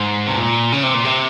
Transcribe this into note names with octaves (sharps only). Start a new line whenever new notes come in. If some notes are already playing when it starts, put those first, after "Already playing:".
Already playing: G#2
C3
A#2
C#3
C3
A#2
C3